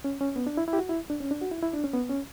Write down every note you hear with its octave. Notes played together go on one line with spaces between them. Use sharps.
C#4
C#4
B3
D4
E4
E4
G4
F#4
E4
D4
C#4
D4
F#4
E4
E4
D4
C#4
B3
C#4